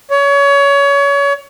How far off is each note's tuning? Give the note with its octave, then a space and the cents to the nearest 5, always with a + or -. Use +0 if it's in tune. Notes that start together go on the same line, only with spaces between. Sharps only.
C#5 +25